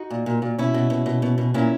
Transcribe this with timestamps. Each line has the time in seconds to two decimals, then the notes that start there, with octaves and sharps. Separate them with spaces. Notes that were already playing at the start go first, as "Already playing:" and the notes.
Already playing: D#4 F#4
0.10 A#2
0.26 A#2
0.42 A#2
0.58 B2 C#4 E4
0.74 B2
0.90 B2
1.06 B2
1.22 B2
1.38 B2
1.54 A#2 C#4 E4